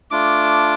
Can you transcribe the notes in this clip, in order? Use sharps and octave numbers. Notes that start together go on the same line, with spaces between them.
A3 D4 F4 D6